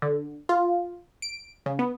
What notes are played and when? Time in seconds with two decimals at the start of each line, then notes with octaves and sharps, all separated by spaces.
0.02 D3
0.49 F4
1.22 D7
1.66 C#3
1.79 B3